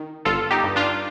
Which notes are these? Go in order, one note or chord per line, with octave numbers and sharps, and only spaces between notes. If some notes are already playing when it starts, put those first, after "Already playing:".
Already playing: D#3
G1 F4 A4
D#4 G4
G2
D4 F4